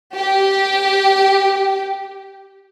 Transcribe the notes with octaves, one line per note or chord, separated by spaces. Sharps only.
G4